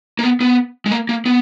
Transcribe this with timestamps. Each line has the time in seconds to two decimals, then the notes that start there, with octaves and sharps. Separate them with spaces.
0.19 A#3
0.23 B3
0.40 B3
0.86 G#3
0.92 A#3
1.09 A#3
1.26 B3